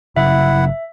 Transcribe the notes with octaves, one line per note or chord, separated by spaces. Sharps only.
G1 C#3 F#3 E4 E5 F#5